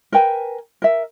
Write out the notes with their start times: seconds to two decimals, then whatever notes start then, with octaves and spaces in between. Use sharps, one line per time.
0.12 A#4 B4 G5 G#5
0.82 A#4 E5